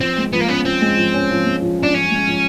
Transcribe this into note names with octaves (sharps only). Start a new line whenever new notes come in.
F3 C4
G#3
F3 B3
A#3
B3 C#4
F3 C4
G#3
F3
C#4
F3
G#3
F3
C#4 D4
F3 C#4
G#3
F3